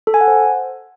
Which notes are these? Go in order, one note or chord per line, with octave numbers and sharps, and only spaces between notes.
A4
G#5
F#5
C5